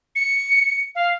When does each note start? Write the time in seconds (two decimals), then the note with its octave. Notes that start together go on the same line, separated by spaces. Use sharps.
0.16 C#7
0.95 F5